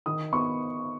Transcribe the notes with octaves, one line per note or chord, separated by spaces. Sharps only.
D#3 D#6
B3 C#6